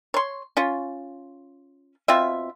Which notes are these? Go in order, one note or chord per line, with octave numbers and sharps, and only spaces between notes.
C#5 C6
C#4 F4
B2 C4 F4 E5